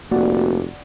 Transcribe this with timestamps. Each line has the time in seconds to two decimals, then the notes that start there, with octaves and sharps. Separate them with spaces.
0.11 F1 A#3 F#4 D5 F#5